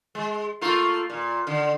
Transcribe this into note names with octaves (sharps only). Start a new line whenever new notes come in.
G#3
A3 A#3 F4
A#2
D3